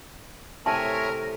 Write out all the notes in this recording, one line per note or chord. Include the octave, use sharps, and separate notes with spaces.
A2 C3 A#4 C#5 E5 G#5 A5 C6